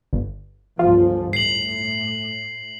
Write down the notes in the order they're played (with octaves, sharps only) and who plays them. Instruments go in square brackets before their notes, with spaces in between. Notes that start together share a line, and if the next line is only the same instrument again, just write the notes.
[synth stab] G1
[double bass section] G1 C#2 F3 [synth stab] F4
[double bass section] A2 [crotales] C7 F#7